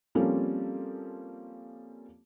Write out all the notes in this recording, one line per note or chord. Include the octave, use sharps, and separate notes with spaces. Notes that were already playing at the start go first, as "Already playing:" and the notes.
F3 G3 A#3 C4 C#4 A4